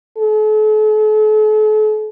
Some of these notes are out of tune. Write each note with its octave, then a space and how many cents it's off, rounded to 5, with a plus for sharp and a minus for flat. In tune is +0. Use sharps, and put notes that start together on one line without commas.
A4 -45